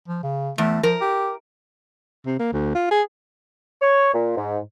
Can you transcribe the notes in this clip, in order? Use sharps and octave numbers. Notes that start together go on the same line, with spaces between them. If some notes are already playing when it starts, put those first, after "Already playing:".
F3
C#3
E2 A3
F3 A#4
G4
C3
A#3
D2
F4
G#4
C#5
A#2
G#2